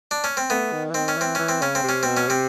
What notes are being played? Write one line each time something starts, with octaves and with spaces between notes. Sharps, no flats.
D4
C#4
C4
A3 B3
D#3
E3
D#3 C4
C#4
E3 C4
E3 C#4
C4
C#3 C#4
C4
C3
C#4
B2 C4
C#4
C3 C4